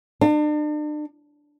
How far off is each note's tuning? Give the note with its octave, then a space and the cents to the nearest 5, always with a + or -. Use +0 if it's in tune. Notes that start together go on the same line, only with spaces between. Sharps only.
D4 +40